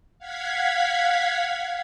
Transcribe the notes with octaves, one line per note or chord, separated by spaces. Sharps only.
F5 F#5 G#6 B6